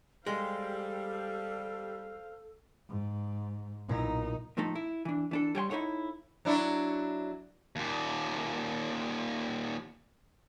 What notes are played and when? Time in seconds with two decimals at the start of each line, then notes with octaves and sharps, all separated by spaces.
0.27 G3 G#3 A4 C5 F5
2.89 G#2
3.89 B1 A#2 D#4 E4 A#5
4.57 A2 F3 A3 D#4 A4
4.75 E4
5.05 E3 D4
5.31 E3 D4 A4
5.55 G3 C#5 G5 C6
5.70 D#4 E4 A4 C#5 F#5
6.45 F#3 D4 E4
7.76 D#2 A#2